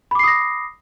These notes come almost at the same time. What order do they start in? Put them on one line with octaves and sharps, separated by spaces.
B5 D6 C7 D#6 A#6